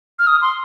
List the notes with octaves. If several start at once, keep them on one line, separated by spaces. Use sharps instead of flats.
F6
D#6
C6